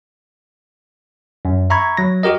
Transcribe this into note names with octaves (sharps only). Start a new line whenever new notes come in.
F#2
E5 A#5 B5 C#6 G#6
F#3 A#6
F#4 G4 A#4 D#5